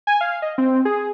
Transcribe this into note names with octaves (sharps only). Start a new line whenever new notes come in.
G#5
F5
D#5
C4
G#4